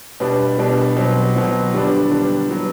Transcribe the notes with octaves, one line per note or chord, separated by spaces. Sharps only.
B2 G3 B3 D4
B2 G3 B3 D4
B2 F#3 C4
B2 F#3 C4
D3 G3 B3 D4
D3 G3 B3 D4
F#3 B3